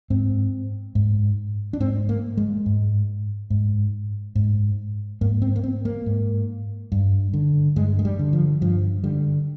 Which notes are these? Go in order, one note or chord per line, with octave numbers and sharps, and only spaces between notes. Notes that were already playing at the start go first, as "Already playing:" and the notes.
G#2 C4
G#2
D4
G#2 C4
A#3
G#3
G#2
G#2
G#2
G#2 A#3
C4
A#3
C4
A#3
G#2
G2
D3
G2 G#3
G#3
G3
D3
F3
G2 F3
D3 G3